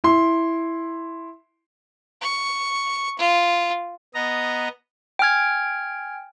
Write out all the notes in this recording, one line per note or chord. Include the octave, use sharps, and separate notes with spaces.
E4 C6
C#6
F4
B3 D#5 A#5
G5 G#5 F6 G#6